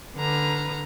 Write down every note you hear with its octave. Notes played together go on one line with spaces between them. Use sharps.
D3 B4 A#5 F6